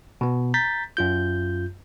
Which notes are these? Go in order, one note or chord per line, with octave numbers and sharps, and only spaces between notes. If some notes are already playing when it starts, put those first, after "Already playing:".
B2 B3
A#5 G6 A6 B6
F#2 F4 G6